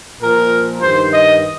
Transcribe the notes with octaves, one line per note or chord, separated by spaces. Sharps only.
A#2 F3 A#4
G2 D#3 C5
D#5